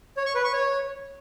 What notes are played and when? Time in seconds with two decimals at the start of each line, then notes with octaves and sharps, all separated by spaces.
0.17 C#5
0.26 C#6
0.35 B4
0.44 C#6
0.53 C#5